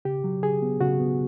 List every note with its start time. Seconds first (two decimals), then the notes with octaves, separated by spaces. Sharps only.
0.05 C#3 G4
0.24 F#3
0.43 C#3 G#4
0.62 B3
0.80 C#3 F#4
1.00 B3